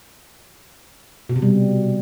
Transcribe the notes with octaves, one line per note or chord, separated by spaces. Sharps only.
B2
C3
G3